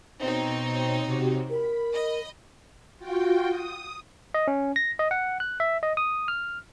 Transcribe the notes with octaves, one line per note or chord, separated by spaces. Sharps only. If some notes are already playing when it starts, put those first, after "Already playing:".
B2 C4 D#4 C#5
C3 F#4 G4
A#4 B5
D#5
F4 F#4 G5
D#6
D#5
C#4
A#6
D#5
F#5
F#6
E5
D#5
D#6
F6